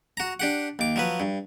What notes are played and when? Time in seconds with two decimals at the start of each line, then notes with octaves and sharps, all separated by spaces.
0.17 F#4 A#5
0.40 D4 G4 F#5
0.79 D#2 D6
0.96 F3 F#3 B4
1.20 G2